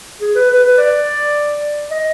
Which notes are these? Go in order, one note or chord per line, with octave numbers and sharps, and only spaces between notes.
G#4
B4
B4
B4
D5
D#5